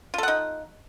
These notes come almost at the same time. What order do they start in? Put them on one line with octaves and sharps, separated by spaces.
F4 A4 F#5 D#4